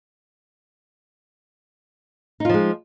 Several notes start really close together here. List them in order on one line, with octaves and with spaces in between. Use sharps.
D#4 F4 F3 G#3